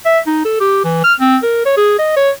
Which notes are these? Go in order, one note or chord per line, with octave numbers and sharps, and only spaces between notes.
E5
D#4
A4
G4
E3
F6
C4
A#4
C#5
G#4
D#5
C#5